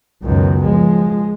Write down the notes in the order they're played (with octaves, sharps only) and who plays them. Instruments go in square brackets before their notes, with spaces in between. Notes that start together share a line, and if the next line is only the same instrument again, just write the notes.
[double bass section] C#2 B2 D#3 [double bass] F#2
[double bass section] F3 [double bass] G#3